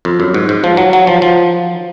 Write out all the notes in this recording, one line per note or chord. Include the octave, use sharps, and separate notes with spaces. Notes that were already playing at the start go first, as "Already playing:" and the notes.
F2
F#2
G#2
G#2
F3
F#3
F#3
F3
F3